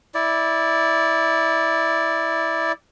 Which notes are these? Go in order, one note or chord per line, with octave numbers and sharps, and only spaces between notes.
E4 D5